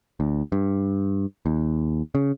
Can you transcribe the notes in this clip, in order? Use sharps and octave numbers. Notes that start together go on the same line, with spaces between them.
D2
G2
D#2
C#3